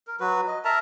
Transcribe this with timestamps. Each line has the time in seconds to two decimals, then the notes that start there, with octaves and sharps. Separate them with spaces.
0.07 A#4
0.20 F#3 F#4 B4
0.48 D#5
0.65 A#4 E5 A5 A#5